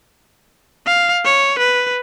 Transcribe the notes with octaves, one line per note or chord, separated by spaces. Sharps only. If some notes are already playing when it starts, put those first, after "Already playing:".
F5
C#5
B4